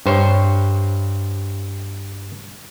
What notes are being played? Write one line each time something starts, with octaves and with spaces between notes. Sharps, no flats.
G2 C5 C#5